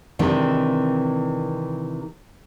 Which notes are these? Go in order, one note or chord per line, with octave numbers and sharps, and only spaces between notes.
C3 D#3 E3 G#3 C4 D4